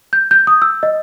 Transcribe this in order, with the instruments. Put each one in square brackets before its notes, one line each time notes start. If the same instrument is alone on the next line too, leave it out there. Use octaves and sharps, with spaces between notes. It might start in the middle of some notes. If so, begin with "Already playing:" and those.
[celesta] G6
G6
D#6
E6
D#5